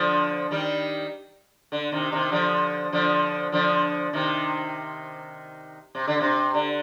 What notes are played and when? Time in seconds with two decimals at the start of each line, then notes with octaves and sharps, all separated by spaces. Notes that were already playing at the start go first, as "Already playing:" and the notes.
Already playing: D3 F3
0.51 D#3 G3
1.72 D3
1.92 C3 D#3
2.12 C3 D#3
2.32 D3 F3
2.92 D3 F3
3.52 D3 F3
4.13 C3 D#3
5.95 C3
6.07 D3
6.20 C3
6.54 D3